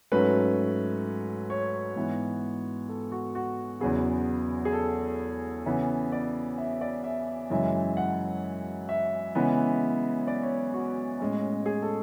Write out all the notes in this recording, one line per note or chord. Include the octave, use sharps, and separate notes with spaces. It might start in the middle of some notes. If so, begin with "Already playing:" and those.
G#2 F#3 A3 C#4 B4
C#5
G#2 E3 B3
A4
F#4
F#4
E2 C#3 F#3 B3 G#4
G#4
A4
C#3 E3 B3
D5
E5
D5
E5
F#2 C#3 E3 G#3 E5
F#5
E5
C#3 E3 G#3 B3
D5
C#5
F#4
A2 G#3 C#4
G#4
A4